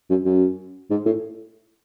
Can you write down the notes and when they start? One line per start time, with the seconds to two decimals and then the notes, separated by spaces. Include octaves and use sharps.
0.10 F#2
0.26 F#2
0.90 G#2
1.06 A2